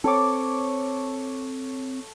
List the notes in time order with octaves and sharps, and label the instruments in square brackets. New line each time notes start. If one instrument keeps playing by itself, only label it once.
[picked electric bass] C4 [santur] A4 C#5 D6